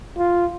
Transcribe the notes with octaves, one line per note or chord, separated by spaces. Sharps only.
F4